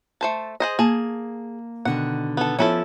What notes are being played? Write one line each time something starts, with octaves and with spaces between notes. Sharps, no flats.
A3 C5 A5
G#4 C5 D#5
A#3 G#4 A5
B2 D3 D#3 F#5
B3 A4
F3 B3 C#4 E4 A4